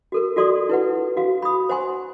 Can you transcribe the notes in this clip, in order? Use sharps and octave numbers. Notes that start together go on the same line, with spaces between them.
F#4 A4 A#4
F4 F#4 A4 D5 C6 D#6
E4 B4 F#5
F#4 F5
B5 D#6
C5 F#5 G#5 C6